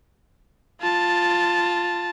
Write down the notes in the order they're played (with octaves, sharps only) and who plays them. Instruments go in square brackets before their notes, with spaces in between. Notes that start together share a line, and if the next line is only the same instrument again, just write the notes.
[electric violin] F4 A5